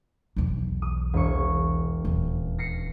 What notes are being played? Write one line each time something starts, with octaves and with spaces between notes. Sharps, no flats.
B1 E2
D#6
E1 C#6
D#1
A#6 C7 C#7